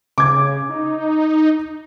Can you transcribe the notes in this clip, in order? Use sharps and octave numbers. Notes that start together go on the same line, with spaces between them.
C#3 D6 G#6
D#4